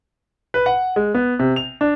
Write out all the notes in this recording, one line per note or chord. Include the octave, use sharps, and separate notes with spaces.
B4
F#5
G#3
B3
C3
F7
D4